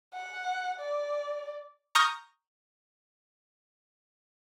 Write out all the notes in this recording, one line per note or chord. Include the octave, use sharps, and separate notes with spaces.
F#5
D5
A#5 C#6 D#6 F6 G6 A#6